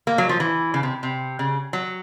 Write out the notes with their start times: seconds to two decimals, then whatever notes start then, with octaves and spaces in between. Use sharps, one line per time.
0.07 A#3
0.18 F#3
0.29 F3
0.40 E3
0.74 C#3
0.83 C3
1.03 C3
1.39 C#3
1.73 F#3